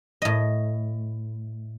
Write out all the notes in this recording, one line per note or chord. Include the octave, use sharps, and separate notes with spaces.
A2 D#5